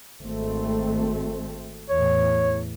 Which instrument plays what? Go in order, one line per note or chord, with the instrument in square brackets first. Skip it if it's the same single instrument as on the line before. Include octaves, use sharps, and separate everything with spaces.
[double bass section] G#1 A3 C4
[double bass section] E2 A2 [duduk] C#5